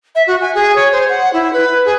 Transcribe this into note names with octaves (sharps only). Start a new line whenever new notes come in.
E5
F#4
G#5
G#4
C#5
C5
F#5
E4
B4
G#4